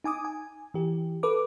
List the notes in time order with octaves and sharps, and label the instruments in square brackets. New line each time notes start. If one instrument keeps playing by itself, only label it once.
[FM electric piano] D#4 G#5 D6 D#6
G#5
E3 G4
A4 B4 D6